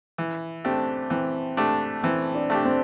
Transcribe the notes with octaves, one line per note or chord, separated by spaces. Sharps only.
E3
A3 C4 D4 G4
E3 C4
A3 D4 G4
E3 C4
D4
A3 D4 G4
C4